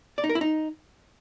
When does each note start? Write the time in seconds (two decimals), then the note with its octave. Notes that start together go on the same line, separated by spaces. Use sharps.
0.18 D5
0.24 D#4
0.29 A#4
0.35 E4
0.41 D#4